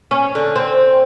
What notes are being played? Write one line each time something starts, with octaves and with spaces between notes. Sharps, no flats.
C#4
D3
C4